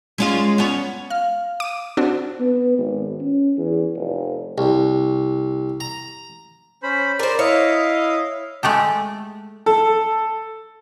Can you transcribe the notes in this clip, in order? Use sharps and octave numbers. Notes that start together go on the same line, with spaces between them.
G#3 C#4 F4
B3 C#4
F5 F6
D6 D#7
C4 D4 F#4
B3
G#1
C#4
E2
F1
C2
A#5
C#4 C5 B5
A#4 C5 D5
E4 C#5 D#5 F5
G#3 A3 G4 A4
A4